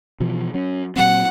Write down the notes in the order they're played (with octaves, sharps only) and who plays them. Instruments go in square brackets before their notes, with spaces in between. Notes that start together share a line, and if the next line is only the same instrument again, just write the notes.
[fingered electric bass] B2 E3 F3
F#3 C#4
[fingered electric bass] A#2 F#3 C4 [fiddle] F#5